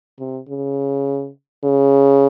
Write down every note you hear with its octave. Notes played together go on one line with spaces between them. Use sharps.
C3
C#3
C#3